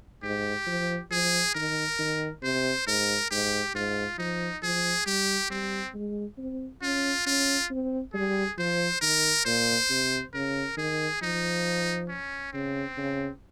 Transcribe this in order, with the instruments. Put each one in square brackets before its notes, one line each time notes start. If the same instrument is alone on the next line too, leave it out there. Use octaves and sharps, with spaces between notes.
[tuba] G#2 [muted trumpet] G4
[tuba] F3
[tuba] F3 [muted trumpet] G#4
[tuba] D#3 [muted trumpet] A#4
[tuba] D#3
[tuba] C3 [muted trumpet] C5
[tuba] G#2 [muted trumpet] A#4
[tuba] G#2 [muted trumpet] G4
[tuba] G#2 [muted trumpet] F4
[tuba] F3 [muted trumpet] D#4
[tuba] F3 [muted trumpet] G#4
[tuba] G3 [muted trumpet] G4
[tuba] G3 [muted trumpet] C4
[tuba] G#3
C4
[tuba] C#4 [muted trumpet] F4
[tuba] C#4 [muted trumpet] F4
[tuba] C4
[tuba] G3 [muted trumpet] G#4
[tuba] F3 [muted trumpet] C5
[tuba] D#3 [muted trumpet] A#4
[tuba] A#2 [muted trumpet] C5
[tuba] C3
[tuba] C#3 [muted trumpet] A#4
[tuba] D#3 [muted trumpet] G#4
[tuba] F3 [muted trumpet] D#4
[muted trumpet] C#4
[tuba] C#3 [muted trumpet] C4
[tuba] C#3